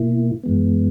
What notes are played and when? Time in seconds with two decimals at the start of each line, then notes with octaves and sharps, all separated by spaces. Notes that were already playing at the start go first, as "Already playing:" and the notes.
Already playing: B2 A#3 E4
0.43 F#2 E3 G#3 B3